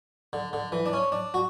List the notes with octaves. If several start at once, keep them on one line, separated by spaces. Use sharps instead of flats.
D3
D3
E3
D4
C#4
D4
F#4